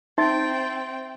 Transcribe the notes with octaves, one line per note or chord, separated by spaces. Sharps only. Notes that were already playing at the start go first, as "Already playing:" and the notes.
C4 D#4 E5 G5 C6 A6